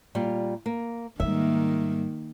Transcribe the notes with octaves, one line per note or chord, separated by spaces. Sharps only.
A#2 G3 F4
A#3
G#2 D#3 G3 A#3 E5